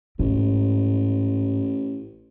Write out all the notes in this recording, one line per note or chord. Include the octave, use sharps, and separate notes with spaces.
A1 G#2